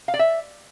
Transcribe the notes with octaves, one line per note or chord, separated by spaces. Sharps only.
F5
D5
E5